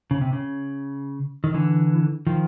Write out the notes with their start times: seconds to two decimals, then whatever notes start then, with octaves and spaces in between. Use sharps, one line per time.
0.11 C#3
0.21 C3
0.33 C#3
1.44 D#3
1.54 D3 E3
2.27 D#3 F3